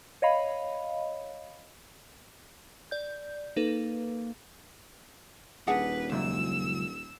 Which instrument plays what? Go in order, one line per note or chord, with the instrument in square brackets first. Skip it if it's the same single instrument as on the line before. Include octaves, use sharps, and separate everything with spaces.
[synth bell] C#5 D#5 F5 B5
D5 G6
[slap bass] A#3 [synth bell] D#4 A4 B4
[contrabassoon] D#1 [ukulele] D4 G#4 F#5 [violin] B4
[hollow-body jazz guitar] C#2 F#2 A#2 [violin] E6